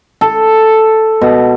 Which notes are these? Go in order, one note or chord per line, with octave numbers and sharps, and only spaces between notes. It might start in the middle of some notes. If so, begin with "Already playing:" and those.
A4
B2